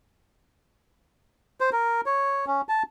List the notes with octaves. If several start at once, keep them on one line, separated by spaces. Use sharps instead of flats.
C5
A#4
C#5
C#4
A5